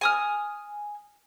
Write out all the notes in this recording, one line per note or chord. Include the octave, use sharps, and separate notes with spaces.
G#5 D#6 F6